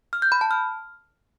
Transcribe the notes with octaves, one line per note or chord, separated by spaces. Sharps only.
F6
G6
B5
A5
F6